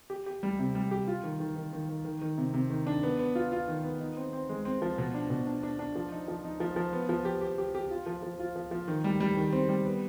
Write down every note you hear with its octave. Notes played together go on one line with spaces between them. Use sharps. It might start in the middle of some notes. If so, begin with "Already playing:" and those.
G4
G4
G3
C3
G3
G4
F4
D#3
D#3
D#3
D#3
D#3
D#3
D#3
C3
C3
D#3
D4
B3
B3
F4
F4
D#3
B3
D#4
C4
C4
G#3
C4
F3
B2
D4
B2
D4
D4
D4
F3
D#4
F3
D#4
F3
F3
B3
F3
G4
G4
G4
G4
F4
F3
F3
F4
F3
F3
D#3
G3
G3
D#3
C4
G3
B3